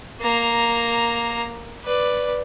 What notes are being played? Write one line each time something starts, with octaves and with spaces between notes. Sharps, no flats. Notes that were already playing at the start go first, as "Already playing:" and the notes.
A#3 A#5
B4 D5